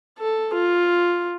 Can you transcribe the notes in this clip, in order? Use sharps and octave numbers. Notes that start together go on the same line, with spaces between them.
A4
F4